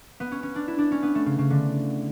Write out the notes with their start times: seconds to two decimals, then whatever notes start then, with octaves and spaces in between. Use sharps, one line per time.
0.20 B3
0.32 C#4
0.43 C#4
0.56 D4
0.68 E4
0.79 D4
0.92 C#4
1.03 B3
1.15 A3
1.26 C#3
1.39 C#3
1.50 D3